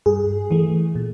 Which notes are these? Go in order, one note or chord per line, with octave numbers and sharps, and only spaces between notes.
G2 G#4
E3 A3
A#2